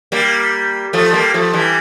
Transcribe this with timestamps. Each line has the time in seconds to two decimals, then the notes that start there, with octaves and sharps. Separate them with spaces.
0.12 G3 A#3
0.93 F3 A3
1.13 G3 A#3
1.34 F3 A3
1.53 E3 G3